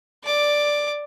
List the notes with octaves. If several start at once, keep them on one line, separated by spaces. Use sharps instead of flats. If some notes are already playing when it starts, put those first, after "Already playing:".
D5 D6